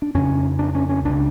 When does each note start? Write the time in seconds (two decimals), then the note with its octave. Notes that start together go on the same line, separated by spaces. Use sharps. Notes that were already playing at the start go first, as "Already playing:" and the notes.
0.02 D4
0.14 F2 C#3 C#4
0.59 D4
0.75 C#4
0.89 C#4
1.05 C#2 C#3 D4